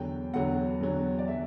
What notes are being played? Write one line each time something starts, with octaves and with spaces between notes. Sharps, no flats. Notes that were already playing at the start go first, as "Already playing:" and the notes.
Already playing: E2 D3 F#3 G5
E2 D3 F#3 F#5
E2 D3 F#3
D5
D3 F#3 E5